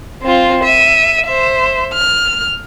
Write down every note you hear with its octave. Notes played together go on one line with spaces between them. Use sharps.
C4 F4
E5 D#7
C5 E5
F6